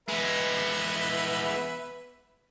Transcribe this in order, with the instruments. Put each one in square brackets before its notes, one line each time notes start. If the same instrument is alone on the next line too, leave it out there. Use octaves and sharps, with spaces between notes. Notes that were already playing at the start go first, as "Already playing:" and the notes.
[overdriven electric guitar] G#3 B3 [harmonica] B4 E5